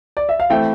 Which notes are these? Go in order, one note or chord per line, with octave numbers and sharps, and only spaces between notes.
D5
E5
F5
E3 A3 C4 E5 G5